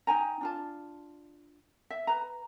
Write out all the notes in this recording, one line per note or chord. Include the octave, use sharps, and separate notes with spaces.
D#4 G5 G#5 A#5
D4 F4 A5
E5
B4 A#5